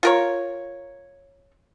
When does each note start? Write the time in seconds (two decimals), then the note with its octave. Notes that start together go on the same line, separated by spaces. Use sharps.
0.03 F4 A#4 C#5